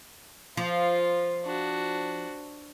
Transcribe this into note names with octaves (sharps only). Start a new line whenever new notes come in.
F3 F4
D4 F#4